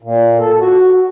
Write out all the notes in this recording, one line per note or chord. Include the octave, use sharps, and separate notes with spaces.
A#2
A4
F#4